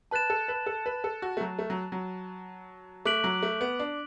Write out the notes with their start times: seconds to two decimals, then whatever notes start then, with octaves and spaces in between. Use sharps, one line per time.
0.11 B4 A5 F#6 A6 E7
0.30 A4
0.48 B4
0.66 A4
0.86 B4
1.04 A4
1.22 F#4
1.37 A3
1.41 F#3
1.59 A3
1.70 F#3
1.92 F#3
3.05 A3 D6 F#6 B6 D7 F#7
3.24 F#3
3.43 A3
3.61 B3
3.79 D4